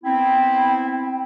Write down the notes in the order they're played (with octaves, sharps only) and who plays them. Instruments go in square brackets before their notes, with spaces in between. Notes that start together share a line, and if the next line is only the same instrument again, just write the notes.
[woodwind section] B3 C4 E4 [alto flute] G5